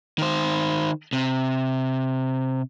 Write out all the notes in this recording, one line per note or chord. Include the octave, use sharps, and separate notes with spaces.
D#3 C5
C3